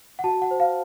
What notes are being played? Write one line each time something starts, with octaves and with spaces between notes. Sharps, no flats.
F#5
F#4 A5
F#5
C5
F5